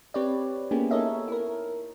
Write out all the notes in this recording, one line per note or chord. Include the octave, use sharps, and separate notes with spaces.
C4 G4 B4 C#5 D5
A#3 B3 C#4 E4 G4 G#4
D#4 A4 A#4 C#5 D#5 E5
E4 A#4